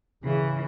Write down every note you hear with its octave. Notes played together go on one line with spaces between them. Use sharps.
C#3 E3